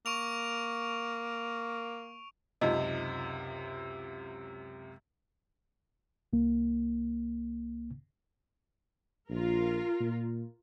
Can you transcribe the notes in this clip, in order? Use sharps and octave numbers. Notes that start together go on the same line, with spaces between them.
A#3 C#6 D7 F7
C#2 F#2 C3 D#4 F4 D#5
C2 A#3
A#1 F4 A#4
A#2